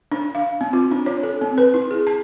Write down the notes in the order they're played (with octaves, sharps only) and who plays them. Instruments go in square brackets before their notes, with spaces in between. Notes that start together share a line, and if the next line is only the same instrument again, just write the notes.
[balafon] D4
F5
C4
F4
D4
C#5
A4
C4
B4
E4
G#4
A5